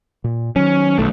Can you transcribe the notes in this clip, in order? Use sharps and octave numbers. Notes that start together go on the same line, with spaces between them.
A#2
D#3 F#3 C#4
B1 A3